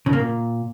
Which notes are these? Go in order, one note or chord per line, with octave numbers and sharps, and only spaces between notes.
C#3
A#3
A#2